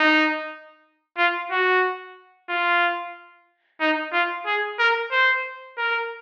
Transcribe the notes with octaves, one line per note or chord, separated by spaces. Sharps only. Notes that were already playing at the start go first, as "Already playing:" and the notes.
Already playing: D#4
F4
F#4
F4
D#4
F4
G#4
A#4
C5
A#4